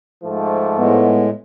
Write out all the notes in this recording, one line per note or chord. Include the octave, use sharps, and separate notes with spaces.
G#2 F3 A3
A2 G#3 B3